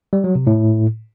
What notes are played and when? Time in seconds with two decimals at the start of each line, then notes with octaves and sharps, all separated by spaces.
0.13 G3
0.24 F#3
0.35 C3
0.47 A2